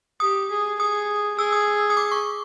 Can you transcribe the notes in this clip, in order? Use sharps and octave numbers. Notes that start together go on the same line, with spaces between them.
G4 D#6
G#4
G#4 D#6
G#4 E6
D#6
D#6
D6
C#6